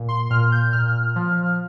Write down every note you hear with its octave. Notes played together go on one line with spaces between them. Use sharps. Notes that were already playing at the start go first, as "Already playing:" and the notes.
Already playing: A#2
C6
A#2 F6
G6
A#2 F6
F3